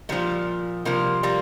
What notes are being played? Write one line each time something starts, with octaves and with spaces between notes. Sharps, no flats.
A#2 F3 G3
C3 F3 G3 A#3
G3 A#3